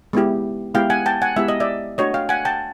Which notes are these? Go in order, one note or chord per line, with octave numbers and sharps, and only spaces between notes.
G#3 B3 E4 G4
G#3 B3 E4 G4 F5 G5
F#5 G#5
G5 A5
F#5 G#5
G#3 B3 E4 G4 E5
D#5
D5 E5
A3 D4 F#4 C#5 D#5
F5 G5
F#5 G#5
G5 A5